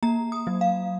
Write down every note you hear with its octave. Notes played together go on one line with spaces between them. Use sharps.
A#3 A#5
D#6
F#3
F5